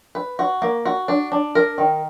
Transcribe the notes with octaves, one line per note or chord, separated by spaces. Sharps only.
B4
F#4
A#3
F#4
D4
D4
A#4
D#3